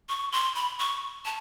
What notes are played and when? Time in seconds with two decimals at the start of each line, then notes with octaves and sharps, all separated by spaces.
0.09 C#6
0.32 C6
0.55 B5
0.79 C#6
1.25 A5